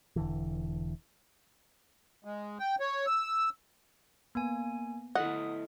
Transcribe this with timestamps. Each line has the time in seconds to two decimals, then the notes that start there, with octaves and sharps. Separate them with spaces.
0.16 E1 D3 E3
2.25 G#3
2.59 G5
2.80 C#5
3.06 E6
4.35 A#3 B3 G#5
5.15 E4 A4 D#5 F#5 D#6